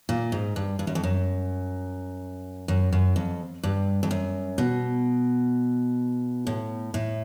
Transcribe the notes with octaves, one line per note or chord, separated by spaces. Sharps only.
A#2
G#2
G2
G2
F#2
F2
F#2
F#2
F#2
F2
G2
F2
F#2
B2
A2
A2